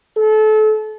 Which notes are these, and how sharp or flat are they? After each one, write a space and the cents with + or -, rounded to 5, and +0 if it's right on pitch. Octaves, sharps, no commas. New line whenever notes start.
A4 -30